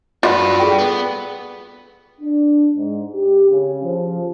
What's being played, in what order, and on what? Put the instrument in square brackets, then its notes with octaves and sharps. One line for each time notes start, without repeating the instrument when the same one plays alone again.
[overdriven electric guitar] D4 B4 [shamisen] F4 F#4
[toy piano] G#4 A4 G5
[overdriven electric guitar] B3
[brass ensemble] D4
G#2
G4
C#3
F3